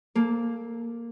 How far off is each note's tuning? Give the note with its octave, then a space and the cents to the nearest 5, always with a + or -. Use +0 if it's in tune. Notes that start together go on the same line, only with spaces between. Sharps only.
A#3 +0 A4 -25